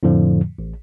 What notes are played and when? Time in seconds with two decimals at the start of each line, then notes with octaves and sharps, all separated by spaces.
0.03 F2 A2 D3 F3
0.59 A1